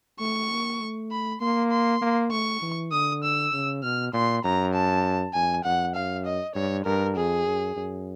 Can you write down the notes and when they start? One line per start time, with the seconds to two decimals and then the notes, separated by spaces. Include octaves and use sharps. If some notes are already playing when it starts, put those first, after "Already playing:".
0.20 A3 C#6
0.51 A#3
0.80 A3
1.12 B5
1.41 A#3 C6
1.71 C6
2.02 A#3
2.32 A3 C#6
2.62 E3
2.92 D3 D#6
3.23 E6
3.53 C#3
3.83 B2 F6
4.13 A#2 C6
4.44 F#2 A#5
4.73 A5
5.34 F2 G#5
5.64 F2 F#5
5.95 F#2 F5
6.26 D#5
6.55 G2 C#5
6.85 G2 A#4
7.16 F2 G#4
7.46 F#2
7.76 F#2